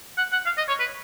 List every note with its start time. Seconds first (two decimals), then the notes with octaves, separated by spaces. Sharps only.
0.17 F#5
0.32 F#5
0.46 F5
0.58 D#5
0.68 C#5
0.80 B4